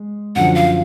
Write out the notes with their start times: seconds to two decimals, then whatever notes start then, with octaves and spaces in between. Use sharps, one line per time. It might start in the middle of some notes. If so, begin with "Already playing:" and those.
Already playing: G#3
0.35 F#2 D3 F3 F#5
0.55 F5